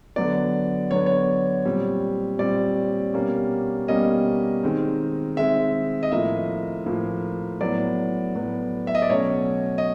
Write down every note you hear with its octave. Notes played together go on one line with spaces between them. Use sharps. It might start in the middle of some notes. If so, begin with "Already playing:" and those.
D3 F#3 B3 D5
D3 F#3 B3 C#5
C#5
A#2 G3 C4
A#2 G3 C4 D5
B2 G3 A#3 C#4
B2 G3 A#3 C#4 D#5
D#3 G#3 C4
D#3 G#3 C4 E5
D#5
A2 F3 A#3 E5
A2 F3 A#3
A2 F#3 B3 D5
A2 F#3 B3
E5
D#5
D5
B2 F#3 A3 C#4 C#5
D#5